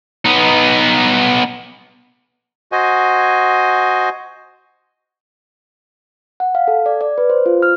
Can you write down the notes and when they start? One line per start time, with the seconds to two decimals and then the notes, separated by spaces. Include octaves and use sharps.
0.25 B3 D#4
2.72 F#4 C5 D#5 G#5
6.40 F#5
6.55 F5
6.68 A4
6.86 D5
7.01 D5
7.18 B4
7.30 C5
7.46 F4
7.62 F6